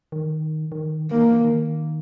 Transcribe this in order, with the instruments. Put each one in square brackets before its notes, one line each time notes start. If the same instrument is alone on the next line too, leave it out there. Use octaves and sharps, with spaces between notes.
[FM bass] D#3
D#3
[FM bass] D#3 [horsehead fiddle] A#3
[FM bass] E3
D#3